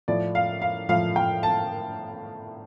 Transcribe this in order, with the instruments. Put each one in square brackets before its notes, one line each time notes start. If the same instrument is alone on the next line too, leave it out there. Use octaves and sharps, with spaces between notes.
[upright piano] A2 F3 D5
F5
F5
A2 F3 F5
G5
A5